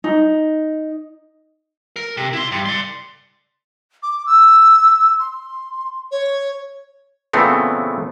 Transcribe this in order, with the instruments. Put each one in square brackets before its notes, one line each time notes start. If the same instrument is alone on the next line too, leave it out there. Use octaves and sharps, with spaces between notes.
[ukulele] D#4
[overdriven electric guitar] A#4
C3
E4 C6
G2
D5 C6
[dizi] D6
E6
C6
C#5
[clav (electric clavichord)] A#2 C#3 E3 A3 B3 C4